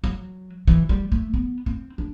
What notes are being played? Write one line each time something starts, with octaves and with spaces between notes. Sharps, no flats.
F#3
E3
G3
A3
B3
C4
D4